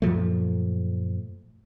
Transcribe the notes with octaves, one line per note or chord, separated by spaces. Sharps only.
F#2 A#2 F3 A3